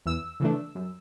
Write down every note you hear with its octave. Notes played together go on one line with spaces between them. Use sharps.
E2 E6
C#3 E3 A3 D4
F#2